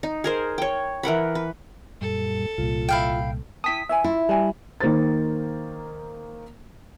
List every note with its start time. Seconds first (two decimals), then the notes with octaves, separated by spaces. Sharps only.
0.03 D#4
0.24 G#4 A#4 C5
0.58 C#5 G5
1.03 E3 A#4 F#5 B5
1.35 B4
2.01 F#2 A#2 G3 A4
2.58 C2 A#2 F4
2.89 E4 F5 G5
3.64 E4 G5 A5 D#6 B6
3.89 E4 C#5 E5 G#5
4.04 E4 F4
4.29 G3 G#5 A5
4.80 D#3 A#3 C5 A6